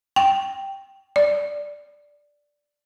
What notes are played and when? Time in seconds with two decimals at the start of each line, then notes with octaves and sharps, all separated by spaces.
0.16 G5
1.16 D5